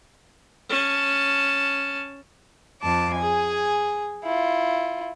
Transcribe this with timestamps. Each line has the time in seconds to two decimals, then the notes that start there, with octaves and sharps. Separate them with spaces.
0.69 C#4 A5
2.83 F2 A5 D6
3.17 G#4 G#5
4.24 E4 F4